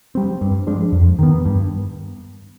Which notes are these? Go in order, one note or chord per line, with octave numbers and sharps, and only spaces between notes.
G3 C4
G2
F3 G#3 D4
F2
D#3 B3
G2